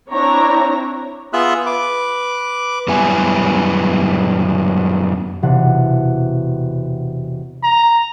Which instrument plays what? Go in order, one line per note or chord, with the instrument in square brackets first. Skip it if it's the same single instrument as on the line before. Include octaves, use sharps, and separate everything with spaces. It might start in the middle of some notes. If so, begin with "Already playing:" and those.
[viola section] C4 D4 E4 C#5 A#5
[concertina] B3 F4 G#4 E5 E6 F#6
B4 D6
[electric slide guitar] F#2 G3 B3 E4 G#5
[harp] E1 C3 F#5
[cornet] A#5